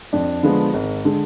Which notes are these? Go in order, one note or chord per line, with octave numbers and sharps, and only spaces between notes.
F2 D4
D3 F3 G#3 B3
G#1
D3 G#3